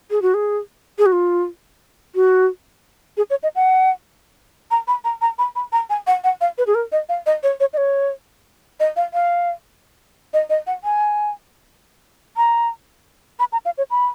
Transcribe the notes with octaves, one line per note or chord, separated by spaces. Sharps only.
G#4
F#4
G#4
G#4
F#4
F4
F#4
G#4
C#5
D#5
F#5
A#5
B5
A#5
A#5
B5
B5
A#5
G#5
F#5
F#5
F5
B4
G#4
A#4
D#5
F5
D#5
C#5
C#5
D#5
C#5
D#5
F5
F5
D#5
D#5
F#5
G#5
A#5
B5
A#5
F5
C#5
B5